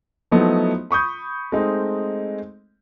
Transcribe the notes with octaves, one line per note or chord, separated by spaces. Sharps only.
F3 F#3 A3 B3 D#4 E4
B5 C#6 D#6 G6
G#3 A3 C4 D#4